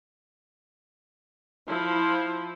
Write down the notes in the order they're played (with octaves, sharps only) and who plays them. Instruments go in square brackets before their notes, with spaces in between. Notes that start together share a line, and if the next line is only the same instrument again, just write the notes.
[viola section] F3 E4